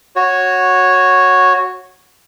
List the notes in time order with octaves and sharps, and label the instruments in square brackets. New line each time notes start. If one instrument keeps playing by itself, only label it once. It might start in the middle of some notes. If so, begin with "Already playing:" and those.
[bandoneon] F#4 C#5